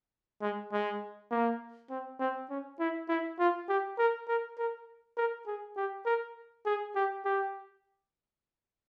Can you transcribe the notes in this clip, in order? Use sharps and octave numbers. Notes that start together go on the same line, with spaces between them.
G#3
G#3
A#3
C4
C4
C#4
E4
E4
F4
G4
A#4
A#4
A#4
A#4
G#4
G4
A#4
G#4
G4
G4